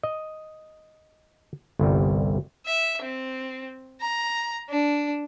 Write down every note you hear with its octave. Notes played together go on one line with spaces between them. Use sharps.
D#5
G1 C2 G3
E5
C4
A#5
D4